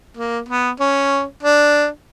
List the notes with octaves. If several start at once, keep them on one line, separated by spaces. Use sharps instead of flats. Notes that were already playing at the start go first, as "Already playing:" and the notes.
A#3
B3
C#4
D4